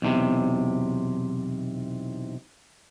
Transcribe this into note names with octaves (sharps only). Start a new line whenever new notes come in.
B1 E2 A2 C3